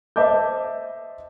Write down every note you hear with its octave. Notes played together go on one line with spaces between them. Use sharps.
C5 D#5 E5 A5 D6 G6